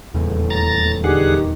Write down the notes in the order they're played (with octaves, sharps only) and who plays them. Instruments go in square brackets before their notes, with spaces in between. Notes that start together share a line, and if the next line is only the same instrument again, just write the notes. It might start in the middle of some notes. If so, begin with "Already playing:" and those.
[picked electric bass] D#1 E2 C#3 [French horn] A2
[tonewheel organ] A#5 A6
[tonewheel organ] D3 G#4 F#5 [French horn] D#3 [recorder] G4